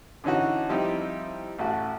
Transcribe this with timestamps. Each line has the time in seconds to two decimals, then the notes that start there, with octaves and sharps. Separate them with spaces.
0.24 D3 E3 C#4 D#4 F#4
0.69 F3 G3 C4 D#4 E4 G4
1.59 A1 A3 F#4